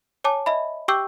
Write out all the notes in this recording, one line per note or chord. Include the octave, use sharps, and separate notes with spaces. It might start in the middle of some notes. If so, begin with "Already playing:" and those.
C#5 G#5 A5 D6
D#5 E5 B5
G4 G5 C#6 D6 E6 G6